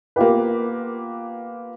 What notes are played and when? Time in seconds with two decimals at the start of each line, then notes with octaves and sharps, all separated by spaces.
0.16 A#3 B3 F4 G4 B4